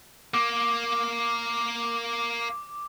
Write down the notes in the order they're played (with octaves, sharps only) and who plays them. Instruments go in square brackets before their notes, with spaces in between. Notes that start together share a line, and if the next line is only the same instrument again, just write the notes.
[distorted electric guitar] A#3 [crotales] D6